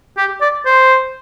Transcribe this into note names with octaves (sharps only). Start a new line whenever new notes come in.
G4
D5
C5